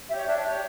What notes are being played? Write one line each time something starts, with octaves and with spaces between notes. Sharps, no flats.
G4 C#5 E5
D4 E5
G4 C#5